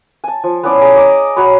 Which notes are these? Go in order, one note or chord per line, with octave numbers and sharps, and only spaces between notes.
G#5 A5
F3
B3 C#4 E4 D5
G#4 A#5
D#5 A#5 D6 D#6
F#3 F#4 C#5 B5